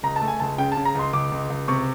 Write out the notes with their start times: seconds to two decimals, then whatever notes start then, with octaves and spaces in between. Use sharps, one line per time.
0.03 C#2 A#5
0.16 A5
0.22 A3
0.28 G#5
0.40 C#2 A5
0.58 C#3 G5
0.72 A5
0.77 C#3
0.85 A#5
0.95 C#2 C6
1.13 C#2 D6
1.32 C#2
1.50 C#2
1.68 C3 C#6